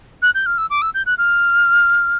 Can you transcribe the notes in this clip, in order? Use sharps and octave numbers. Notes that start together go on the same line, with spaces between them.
F#6
G6
F6
E6
D6
E6
G6
F#6
F6